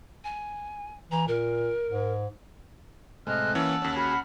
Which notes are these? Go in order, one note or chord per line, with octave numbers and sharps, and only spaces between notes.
G#5
E3 A#5
A#2 A#4
G#2
A2 C3 G#3 D#5 F6 F#6
E3 A#3 C#4 F#5 A5 E6
D#2 C#4
F#4 G#4 F#5 B5 F6